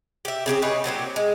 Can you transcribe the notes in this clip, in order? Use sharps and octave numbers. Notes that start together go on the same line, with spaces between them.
G4 E5
C#3 C4 G4 G#4
D#4 G#4 B4 C#5
A#2 F#3 C4 G4
G#3